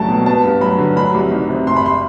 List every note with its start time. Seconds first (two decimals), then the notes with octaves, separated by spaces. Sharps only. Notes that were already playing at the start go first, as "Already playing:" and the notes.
Already playing: C#2 F#3 A3 A5
0.08 B2
0.26 B3 A5
0.44 G2
0.61 F#3 B5
0.78 D3
0.96 F#3 B5
1.14 C2
1.31 D#3
1.49 C3
1.67 F#1 C6
1.76 B5
1.86 C6